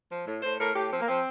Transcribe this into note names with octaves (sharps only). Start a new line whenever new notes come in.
F3
A2
A2 C5
A2 A#4
A2 G4
F3 C4
A#3
F3 C4